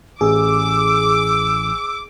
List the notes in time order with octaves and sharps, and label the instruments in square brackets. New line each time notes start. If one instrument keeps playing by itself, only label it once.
[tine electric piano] A1 [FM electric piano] G#4 [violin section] D6 [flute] E6